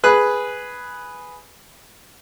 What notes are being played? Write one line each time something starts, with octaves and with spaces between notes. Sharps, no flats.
G#4 B4 F#6